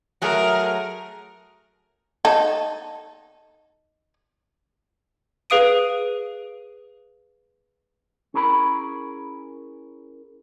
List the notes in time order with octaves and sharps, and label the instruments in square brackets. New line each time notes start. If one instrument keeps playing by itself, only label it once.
[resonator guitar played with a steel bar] F#3 A3 G#4 [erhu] A#4
[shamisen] D#4 A4
[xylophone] G#4 B4 F5 D#6 D7 D#7
[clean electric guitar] C#4 E4 G#4 A#4 A#5 B5